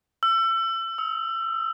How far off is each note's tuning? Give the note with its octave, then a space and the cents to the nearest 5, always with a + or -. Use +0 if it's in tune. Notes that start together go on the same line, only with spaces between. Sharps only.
E6 +30
E6 -35